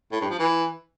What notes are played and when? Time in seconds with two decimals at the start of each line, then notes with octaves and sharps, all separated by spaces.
0.12 A2
0.21 G2
0.30 F3
0.39 E3